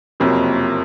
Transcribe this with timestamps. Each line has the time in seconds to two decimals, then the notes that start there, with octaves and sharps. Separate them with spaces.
0.20 F#1 F2 C3 F#3 A#3